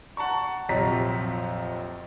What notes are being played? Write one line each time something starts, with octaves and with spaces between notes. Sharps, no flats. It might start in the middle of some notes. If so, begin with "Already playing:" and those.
F#5 A5 A#5 C#6
A#1 F2 C3 F#3 A#5 B6